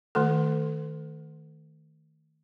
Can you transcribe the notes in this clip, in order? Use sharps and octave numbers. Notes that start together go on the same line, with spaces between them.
D#3 A3 A4